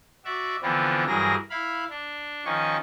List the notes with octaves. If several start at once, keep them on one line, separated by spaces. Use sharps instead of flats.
F#4 D5 E5
D3 E3 F3 B3 C4 D4
G2 E3 F#3 G#4 A#4 A#6
E4 F5 B5
D4
D#3 F3 C#4 C#6